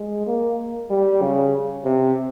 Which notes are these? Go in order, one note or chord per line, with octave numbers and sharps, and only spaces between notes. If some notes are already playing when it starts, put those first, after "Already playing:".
Already playing: G#3
A#3
G3
C#3
C3